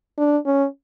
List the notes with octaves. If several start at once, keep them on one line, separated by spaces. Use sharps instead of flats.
D4
C#4